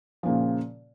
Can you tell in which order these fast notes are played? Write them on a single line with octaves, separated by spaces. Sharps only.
F3 A#2 C#3